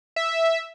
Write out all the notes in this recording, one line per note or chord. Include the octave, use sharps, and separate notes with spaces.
E5